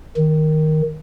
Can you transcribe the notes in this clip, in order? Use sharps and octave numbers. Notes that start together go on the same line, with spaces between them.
D#3